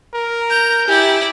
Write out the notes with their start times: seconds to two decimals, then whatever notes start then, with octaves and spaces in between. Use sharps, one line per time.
0.14 A#4
0.50 A#5 G6
0.88 E4 G4 D5 G#5